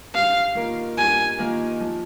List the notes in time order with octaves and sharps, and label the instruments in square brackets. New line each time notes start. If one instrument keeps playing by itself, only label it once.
[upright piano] G2 [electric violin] F5
[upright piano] D#3 A#3 F4 A#4
[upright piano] G2 [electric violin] G#5
[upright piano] D#3 A#3 F4 A#4
F3